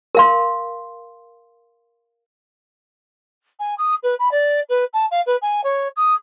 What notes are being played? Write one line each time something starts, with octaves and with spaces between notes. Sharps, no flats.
A#4 F5 C6
G#5
D#6
B4
B5
D5
B4
A5
F5
B4
G#5
C#5
D#6